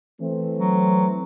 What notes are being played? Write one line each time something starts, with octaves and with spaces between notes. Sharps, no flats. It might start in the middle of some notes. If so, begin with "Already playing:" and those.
E3 A3 C4
F#3